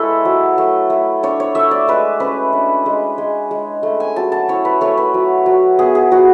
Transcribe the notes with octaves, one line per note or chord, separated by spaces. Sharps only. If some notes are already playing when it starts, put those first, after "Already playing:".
Already playing: G#3 E4 A4 B4 C#5
F#3
A3
A3
D4 C#5
C#5
A3 E5
D5
G#3 B4
C#4 B4
D4
G#3
G#3
G#3
A3
G#5
F#3 A5
A5
E4 C#5
B4
A3 C#5
B4
F#3
F#3
B3 G#4
G#4
F#3 F#4